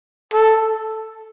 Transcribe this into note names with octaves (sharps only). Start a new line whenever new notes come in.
A4